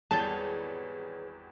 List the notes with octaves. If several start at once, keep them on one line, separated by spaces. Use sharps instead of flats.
G#1 E2 G3 G#4 B4 C#5 A5 G6